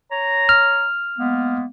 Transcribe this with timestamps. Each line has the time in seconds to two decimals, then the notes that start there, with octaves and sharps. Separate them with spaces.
0.11 C#5 A#5
0.49 F6
1.19 G#3 A#3 B3